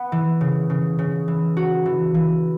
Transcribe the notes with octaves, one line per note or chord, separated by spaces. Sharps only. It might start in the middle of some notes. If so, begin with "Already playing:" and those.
Already playing: B3
E3
C#3
C#3
C#3
E3
F#4
E3
E3